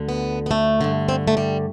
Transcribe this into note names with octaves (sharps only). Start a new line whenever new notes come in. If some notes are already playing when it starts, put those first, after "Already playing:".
Already playing: D2 D3
B3
B3
A3
G2 D3
C4
A3
G3